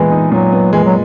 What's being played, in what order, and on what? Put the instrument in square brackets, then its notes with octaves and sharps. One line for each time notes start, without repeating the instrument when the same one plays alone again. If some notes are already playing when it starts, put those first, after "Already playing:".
Already playing: [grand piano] A#2 G#3 B3 [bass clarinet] E3
[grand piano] D#4
[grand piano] A#2 [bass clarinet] F#3
[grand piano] B3
[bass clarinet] E3 [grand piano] G#3
[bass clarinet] F#3